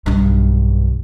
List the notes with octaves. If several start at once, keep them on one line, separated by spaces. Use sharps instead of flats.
B1 G2